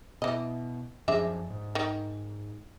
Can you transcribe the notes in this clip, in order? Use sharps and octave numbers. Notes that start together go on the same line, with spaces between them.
B2 E3 D#5
F#2 F3 G#3 D4 E5
G#2
D#3